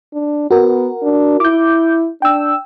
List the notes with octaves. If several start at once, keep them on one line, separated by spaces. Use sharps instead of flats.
D4
B3 F#4 A#4
D4
E4 D6 G6
D4 G5 E6